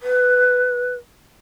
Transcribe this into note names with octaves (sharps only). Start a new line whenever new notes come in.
B4